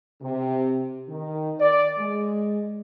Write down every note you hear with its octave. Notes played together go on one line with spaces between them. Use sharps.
C3
D#3
D5
G#3